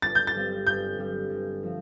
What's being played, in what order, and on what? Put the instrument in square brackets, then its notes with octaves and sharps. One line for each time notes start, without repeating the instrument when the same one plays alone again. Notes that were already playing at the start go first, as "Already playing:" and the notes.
[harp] G1 [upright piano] A6
[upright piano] G6
A6
[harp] G2 G3 C4
[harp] G1 [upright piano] G6
[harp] G2 G3 C4
G1
F3 A3 C4